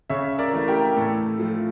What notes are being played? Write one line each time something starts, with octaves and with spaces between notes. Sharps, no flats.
C#3 C#5 E5
A#4 D5
E3 A3
G4 A#4
A2 A4
F3 A3